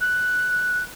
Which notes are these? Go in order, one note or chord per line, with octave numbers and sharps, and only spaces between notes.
F#6